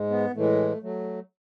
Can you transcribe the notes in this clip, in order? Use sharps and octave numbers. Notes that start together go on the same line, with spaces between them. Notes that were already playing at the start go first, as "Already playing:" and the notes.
Already playing: G#2 G#3
B3
A2 E3 G#3 A3
F#3 A3